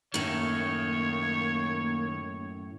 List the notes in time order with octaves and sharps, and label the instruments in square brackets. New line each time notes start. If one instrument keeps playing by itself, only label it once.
[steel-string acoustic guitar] F#2 A2 [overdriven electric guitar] D#3 [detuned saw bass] A#3 [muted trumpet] C#5